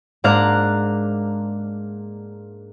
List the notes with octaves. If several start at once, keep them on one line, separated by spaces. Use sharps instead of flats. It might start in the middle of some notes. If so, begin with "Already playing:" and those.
G#2 A#3 D4 F5 A#5 F#6